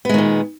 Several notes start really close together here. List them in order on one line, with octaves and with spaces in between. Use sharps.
B3 G#3 D#3 A#2